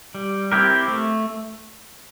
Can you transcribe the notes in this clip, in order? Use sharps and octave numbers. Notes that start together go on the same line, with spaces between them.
G3
C4 E4 G4 A#4
A3